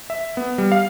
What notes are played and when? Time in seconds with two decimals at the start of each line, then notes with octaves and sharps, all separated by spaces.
0.10 E5
0.37 B3
0.58 G3
0.72 F5